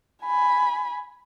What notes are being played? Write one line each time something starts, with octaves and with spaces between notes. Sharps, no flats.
G#5 B5